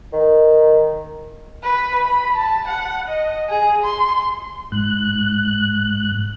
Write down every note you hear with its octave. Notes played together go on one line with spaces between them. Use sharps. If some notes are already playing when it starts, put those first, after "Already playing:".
D#3
B4
B5
A5
F#5
D#5
G#4
C6
G#2 F#6